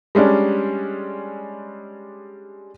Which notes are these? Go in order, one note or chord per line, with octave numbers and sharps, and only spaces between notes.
G3 G#3 C#4 D4